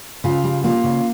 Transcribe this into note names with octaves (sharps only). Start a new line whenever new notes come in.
C#3 F4
G3
A#3 F4
C#3